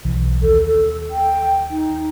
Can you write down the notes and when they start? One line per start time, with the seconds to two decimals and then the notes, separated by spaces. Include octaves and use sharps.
0.05 B1 E3
0.42 D#2 A4
0.66 A4
1.10 G5
1.70 D#4